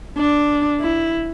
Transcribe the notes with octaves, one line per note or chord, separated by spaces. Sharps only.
D4
E4